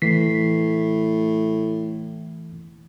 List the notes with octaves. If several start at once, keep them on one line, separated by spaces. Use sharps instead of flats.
A2 E3 B6 C7